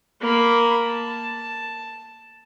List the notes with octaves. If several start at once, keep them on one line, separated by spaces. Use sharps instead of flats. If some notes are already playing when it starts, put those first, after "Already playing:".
A#3 B5
A5